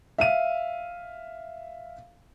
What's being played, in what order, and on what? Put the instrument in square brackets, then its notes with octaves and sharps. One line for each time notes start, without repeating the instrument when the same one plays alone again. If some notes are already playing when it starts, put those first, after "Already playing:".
[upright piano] E5 F5 D#7